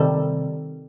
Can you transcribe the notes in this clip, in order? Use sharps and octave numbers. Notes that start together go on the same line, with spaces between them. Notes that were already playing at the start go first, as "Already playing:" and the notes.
Already playing: C3 D#3 G3 A4